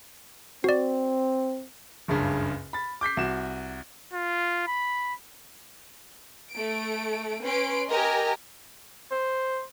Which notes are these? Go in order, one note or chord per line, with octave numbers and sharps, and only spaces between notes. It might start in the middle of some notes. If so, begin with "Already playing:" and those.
C4 F#4 D5
F#1 C#2 G2 C#3
B5 A6
D6 G6 B6 C7
C2 F#4 E7
F4
B5
A3 D7
C#4 B4 C6 D7
G4 A#4 D#5 G#5 A#5
C5